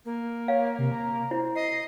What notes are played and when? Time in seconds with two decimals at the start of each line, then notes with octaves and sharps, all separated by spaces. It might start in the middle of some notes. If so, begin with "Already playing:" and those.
0.05 A#3
0.48 C#5 F5
0.79 C3
0.92 A#5
1.31 E4 C5
1.55 D#5 C7